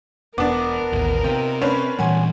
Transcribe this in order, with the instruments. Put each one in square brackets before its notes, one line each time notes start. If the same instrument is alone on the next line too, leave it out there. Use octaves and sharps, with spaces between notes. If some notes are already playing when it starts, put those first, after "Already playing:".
[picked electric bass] E1 [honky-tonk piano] B3 D4 [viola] A#4 [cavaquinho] D6
[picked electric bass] A1 D#2
[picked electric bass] C3 [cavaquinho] D#4 F4 G5
[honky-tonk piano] C#4 D4 C5 [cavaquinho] B4 F5
[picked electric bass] A#2 E3 G3 [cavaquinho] F#5 G#5 C6